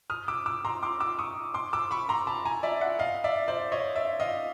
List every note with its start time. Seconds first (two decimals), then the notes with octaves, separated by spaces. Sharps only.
0.10 D#6 F6
0.28 D6 E6
0.46 D6 E6
0.65 A#5 C6
0.83 C6 D6
1.00 D6 E6
1.19 C#6 D#6
1.54 C6 D6
1.73 D6 E6
1.91 B5 C#6
2.09 A#5 C6
2.27 A5 B5
2.45 G#5 A#5
2.63 D5 E5
2.81 E5 F#5
2.99 D#5 F5
3.24 D5 E5
3.48 C5 D5
3.72 C#5 D#5
3.96 D5 E5
4.20 D#5 F5